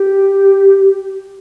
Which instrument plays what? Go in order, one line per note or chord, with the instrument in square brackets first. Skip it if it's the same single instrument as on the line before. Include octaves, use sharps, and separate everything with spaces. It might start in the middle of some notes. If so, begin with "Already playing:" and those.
Already playing: [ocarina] G4